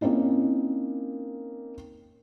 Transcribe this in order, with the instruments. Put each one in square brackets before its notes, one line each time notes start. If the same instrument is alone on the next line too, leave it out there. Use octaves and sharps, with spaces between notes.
[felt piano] A#3 C4 C#4 D#4 E4